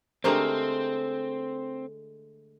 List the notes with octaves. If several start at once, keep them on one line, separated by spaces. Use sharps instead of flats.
D3 G#3 A3 C4 G4 A#4 C5